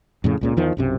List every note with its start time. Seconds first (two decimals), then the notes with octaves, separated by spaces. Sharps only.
0.24 F2 A2 C#3
0.41 C#2 A#2 C#3
0.57 E2 D#3 F3
0.77 B1 F#2 C3